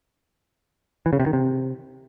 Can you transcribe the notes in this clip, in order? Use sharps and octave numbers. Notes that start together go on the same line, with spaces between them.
E3
C#3
C3
D#3
C3